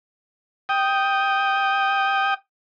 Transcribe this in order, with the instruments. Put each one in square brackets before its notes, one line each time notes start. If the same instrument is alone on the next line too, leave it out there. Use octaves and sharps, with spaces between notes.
[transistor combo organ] G5 D#6